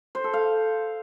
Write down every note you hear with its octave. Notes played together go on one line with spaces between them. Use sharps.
C5
A4
F5